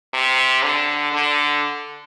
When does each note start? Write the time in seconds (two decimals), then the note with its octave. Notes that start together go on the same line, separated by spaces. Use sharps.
0.14 C3
0.63 D3
1.13 D3